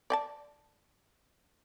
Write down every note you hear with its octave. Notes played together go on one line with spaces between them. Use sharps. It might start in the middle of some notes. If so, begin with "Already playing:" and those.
D5 G5 A5